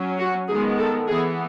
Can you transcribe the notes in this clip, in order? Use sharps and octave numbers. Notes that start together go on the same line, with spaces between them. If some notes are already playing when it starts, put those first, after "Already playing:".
Already playing: F#3 C#4
F#4
D#3 G#3 B3 G#4
A4
E3 B3 G#4